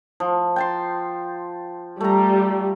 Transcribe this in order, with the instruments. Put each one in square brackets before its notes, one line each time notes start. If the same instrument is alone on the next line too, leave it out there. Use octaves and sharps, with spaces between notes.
[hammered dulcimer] F3
G5 A5 C6
[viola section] G3 [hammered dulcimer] A3 A#5